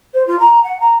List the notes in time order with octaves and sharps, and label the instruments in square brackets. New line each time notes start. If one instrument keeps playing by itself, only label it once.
[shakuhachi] C5
F4
A#5
F#5
A#5